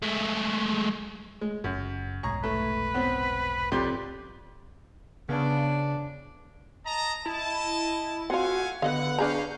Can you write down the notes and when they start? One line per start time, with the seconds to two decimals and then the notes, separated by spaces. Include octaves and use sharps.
0.02 G#3 A3
1.41 G#3
1.64 F#1 F#2
2.23 F1 B1 G#2 G#4 A#5 C#6
2.44 A3 B4
2.94 B3 C4
3.72 F2 G4 D5 C6
5.29 C#3 B3 D4
6.85 D#5 A5 A#5
7.26 E4 D#5 A5
8.30 A3 C4 F4 F#4 F5 F#5 G#5
8.82 D3 B3 B4 D#5 F5 F#5
9.18 C#4 D4 F#4 G#4 F5 A#5 G6